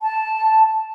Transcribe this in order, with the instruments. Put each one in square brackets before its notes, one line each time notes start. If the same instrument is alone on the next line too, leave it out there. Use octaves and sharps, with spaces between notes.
[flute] A5